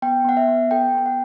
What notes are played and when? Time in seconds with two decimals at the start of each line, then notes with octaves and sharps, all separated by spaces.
0.02 B3 G5
0.25 B3 F#5
0.37 E5
0.48 B3
0.71 A4 G5
0.94 B3 G5
1.06 F#5